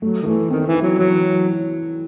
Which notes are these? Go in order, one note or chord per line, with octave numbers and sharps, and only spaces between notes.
F#3 A3
D#3
E3 A3
D#3 C4
E3
E4
F#3
E3 F#3